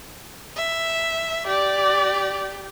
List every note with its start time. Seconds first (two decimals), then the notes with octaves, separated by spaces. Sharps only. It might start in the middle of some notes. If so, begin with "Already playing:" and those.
0.56 E5
1.48 G4 D5